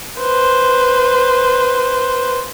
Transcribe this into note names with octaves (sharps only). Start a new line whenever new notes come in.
B4 C5